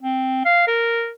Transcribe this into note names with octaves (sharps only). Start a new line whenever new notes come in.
C4
F5
A#4